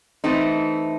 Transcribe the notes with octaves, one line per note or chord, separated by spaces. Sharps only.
E3 A3 C4 D#4